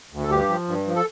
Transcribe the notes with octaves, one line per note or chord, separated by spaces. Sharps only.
D2
A4
G2 G4
F3
G2
F3
A4